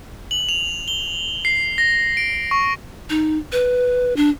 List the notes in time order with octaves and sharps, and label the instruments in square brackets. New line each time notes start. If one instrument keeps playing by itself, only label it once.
[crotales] F#7
F7
G7
C7
A#6
D7
C#6
[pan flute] D#4
B4
D4